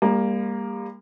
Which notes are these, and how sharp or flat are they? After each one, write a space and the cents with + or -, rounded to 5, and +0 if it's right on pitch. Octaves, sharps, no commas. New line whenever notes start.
G3 +40 A#3 +0